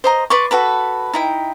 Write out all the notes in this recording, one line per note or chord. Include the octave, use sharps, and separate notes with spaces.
C5 D#5 A#5
B4 D5 C6 C#6
F#4 A4 B4 B5
D#4 E4 G5